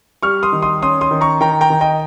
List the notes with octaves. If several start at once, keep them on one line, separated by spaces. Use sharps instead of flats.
G3 C#6 F6
C6 D#6
D#3
C6 D#6
C#4 C6 D#6
C6 D#6
D#3
A#5 C#6
D#3 G5 A#5
G5 A#5
D#3
D#5 G5